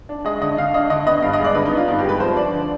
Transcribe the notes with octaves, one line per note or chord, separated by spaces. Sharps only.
D4
G#3 D#5
D3 D#5
D3 F5
D4 D#5
D3 D#5
B3 D#5
G2 F5
D#5
G#3
D5
D3 B4
D#4
B3
F4
G2 D#4
G4
G#3 B4
F3 C5
D4 D5
D3